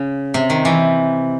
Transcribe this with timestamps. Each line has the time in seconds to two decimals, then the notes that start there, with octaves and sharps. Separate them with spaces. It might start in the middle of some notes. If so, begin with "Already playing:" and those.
Already playing: C#3
0.34 C3
0.50 D#3
0.65 E3